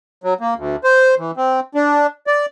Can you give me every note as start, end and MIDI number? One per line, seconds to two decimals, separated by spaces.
0.24 0.34 54
0.41 0.54 58
0.57 0.76 38
0.84 1.15 72
1.19 1.31 52
1.37 1.60 60
1.75 2.07 62
2.27 2.46 74